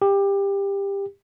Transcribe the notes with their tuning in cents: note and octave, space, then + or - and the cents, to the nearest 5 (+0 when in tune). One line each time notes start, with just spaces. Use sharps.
G4 +20